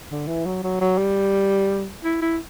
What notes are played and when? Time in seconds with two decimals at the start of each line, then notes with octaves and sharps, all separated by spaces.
0.11 D3
0.28 E3
0.45 F#3
0.63 F#3
0.81 F#3
0.98 G3
2.04 E4
2.22 E4